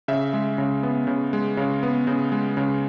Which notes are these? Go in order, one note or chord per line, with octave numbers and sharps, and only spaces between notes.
C#3 E5
G#3
C#3
B3
C#3
G#3
C#3
B3
C#3
G#3
C#3